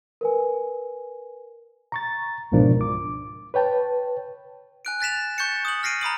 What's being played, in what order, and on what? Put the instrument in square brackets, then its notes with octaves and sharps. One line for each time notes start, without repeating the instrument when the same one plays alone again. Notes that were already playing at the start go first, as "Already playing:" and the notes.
[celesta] A#4 B4 G#5
[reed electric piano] A#5 C#6 A6
C#2 G#2 B2 F3 D4 A#4
D6
B4 C#5 G5 A5
[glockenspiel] G#5 F#6 D7
F#6 A6 B6 E7 F7
C#6 G6 A6 C#7
D#6 F#7
F6 A#6 C7 D7 D#7
A#5 B5 D#6 F#7